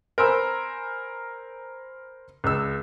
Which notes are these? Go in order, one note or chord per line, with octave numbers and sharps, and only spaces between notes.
A#4 C5 G#5 B5 C6 E6
C#2 E6